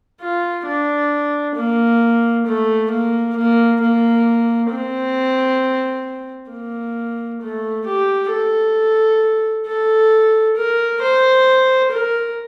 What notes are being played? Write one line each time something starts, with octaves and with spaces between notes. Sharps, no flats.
F4
D4
A#3
A3
A#3
A#3
A#3
C4
A#3
A3
G4
A4
A4
A#4
C5
A#4